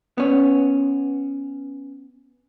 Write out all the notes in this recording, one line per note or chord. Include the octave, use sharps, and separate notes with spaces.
B3 C#4